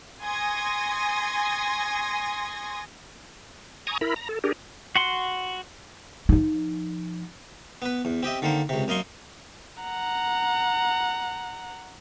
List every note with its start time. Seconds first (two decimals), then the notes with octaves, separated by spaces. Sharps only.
0.23 G#5 C6 C#6 D#6 G#6 A#6
3.87 G#5 A#5 C#6 D#6
4.01 E4 A#4 B5
4.16 A#5
4.29 A4
4.44 D4 G4 G#4 A#4
4.96 F#4 F#5 C6
6.29 F3 D#4
7.82 B3 B4
8.05 E2
8.23 C4 G4 D#5 E5
8.42 D3 D#3 A#3 C5
8.69 C#2 C3
8.88 F#2 A#3 D#5 C6 C#6
9.82 F#5 A#5